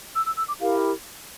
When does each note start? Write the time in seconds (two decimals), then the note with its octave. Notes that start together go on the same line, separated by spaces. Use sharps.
0.14 E6
0.25 E6
0.36 E6
0.48 D6
0.60 E4 G4 A#4 F5